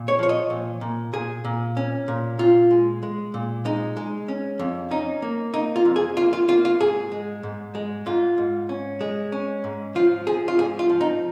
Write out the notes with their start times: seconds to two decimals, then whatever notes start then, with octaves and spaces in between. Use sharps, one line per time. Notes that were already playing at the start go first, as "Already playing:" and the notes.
Already playing: A#2
0.08 C#5
0.19 F3 C#5
0.29 D#5
0.50 A#2
0.81 A#2
1.13 A#2 G#4
1.45 A#2
1.77 C#4
2.08 A#2
2.39 A#2 F4
2.71 G#3
3.03 G#3
3.34 A#2
3.65 G#3 D#4
3.97 G#3
4.28 C#4
4.59 F2
4.91 C#4 D#4
5.22 A#3
5.54 A#3 D#4
5.76 F4
5.85 F2
5.96 G#4
6.17 A#3 F4
6.33 F4
6.48 A#3 F4
6.65 F4
6.80 G#2 G#4
7.12 G#3
7.43 G#2
7.75 G#3
8.06 G#2 F4
8.38 G#2
8.69 C#4
9.01 G#3
9.32 C#4
9.64 G#2
9.95 F3 F4
10.27 F3 G#4
10.48 F4
10.58 G#2 G#4
10.79 F4
10.90 F3
11.01 D#4